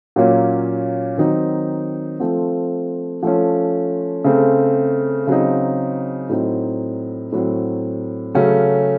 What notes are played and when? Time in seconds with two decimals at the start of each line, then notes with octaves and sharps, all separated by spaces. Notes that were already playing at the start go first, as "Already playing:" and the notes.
0.16 A#2 F#3 A#3 C#4
1.18 D#3 F#3 C4 D#4
2.20 F3 A3 C4
3.23 F3 A3 C#4
4.24 C#3 A3 C4
5.27 C#3 F#3 C4 D#4
6.29 A2 F#3 C4 D#4
7.32 A2 F#3 C4
8.35 C#3 F#3 A3 C#4